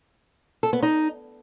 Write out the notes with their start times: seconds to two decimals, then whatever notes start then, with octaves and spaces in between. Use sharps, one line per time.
0.63 A4
0.73 B3
0.83 D#4